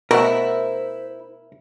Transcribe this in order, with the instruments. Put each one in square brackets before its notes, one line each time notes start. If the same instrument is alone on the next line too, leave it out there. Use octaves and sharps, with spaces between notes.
[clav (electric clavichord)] B2 A3 [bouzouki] E4 [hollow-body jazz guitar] A#4 F#5 [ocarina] C5